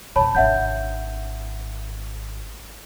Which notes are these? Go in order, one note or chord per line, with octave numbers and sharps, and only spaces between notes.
F2 B2 C#5 A5 B5
G#1 D4 E5 F#5 G6